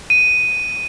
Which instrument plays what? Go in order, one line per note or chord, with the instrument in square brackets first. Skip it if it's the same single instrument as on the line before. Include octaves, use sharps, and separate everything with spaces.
[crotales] D#7